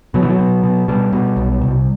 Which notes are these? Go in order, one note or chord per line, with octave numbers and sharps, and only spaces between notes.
B2 F#3
E3
F#3
B2
B2
B2 G3
B2
B1
C2